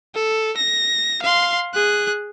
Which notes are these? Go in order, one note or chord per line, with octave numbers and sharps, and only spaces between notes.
A4
A#6
F5 C6
G#4 F#6